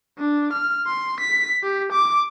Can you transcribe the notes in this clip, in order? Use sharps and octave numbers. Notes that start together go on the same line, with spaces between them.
D4
F6
C6
B6
G4
D6